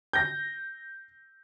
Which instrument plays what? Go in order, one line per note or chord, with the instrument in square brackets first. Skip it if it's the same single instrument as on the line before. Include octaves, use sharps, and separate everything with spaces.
[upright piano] G6 A#6